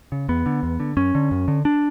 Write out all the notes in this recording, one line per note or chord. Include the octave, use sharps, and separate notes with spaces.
C#3
E2 B3
D3
E2
D3
F#2 C#4
D3
F#2
D3
D4